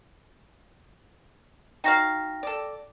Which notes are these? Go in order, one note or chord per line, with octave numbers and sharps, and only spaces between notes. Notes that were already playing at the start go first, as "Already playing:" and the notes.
D#4 F#4 F5 G5 A#6
A4 D5